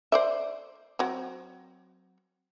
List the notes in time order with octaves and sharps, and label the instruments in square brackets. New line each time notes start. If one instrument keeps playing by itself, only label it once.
[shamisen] C5 D5 E5
F#3 C4